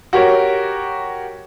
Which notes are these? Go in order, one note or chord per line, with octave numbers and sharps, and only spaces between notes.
F#4 G4 A#4 C#5